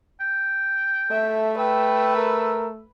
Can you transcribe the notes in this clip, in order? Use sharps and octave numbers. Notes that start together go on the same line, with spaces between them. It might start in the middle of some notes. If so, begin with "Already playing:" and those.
G5
A3 A4 E5
B4 G5 E6
A#4